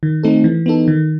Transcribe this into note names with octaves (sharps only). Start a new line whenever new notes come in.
D#3
A3 C4 D#4 A4
E3
B3 D#4 A4
D#3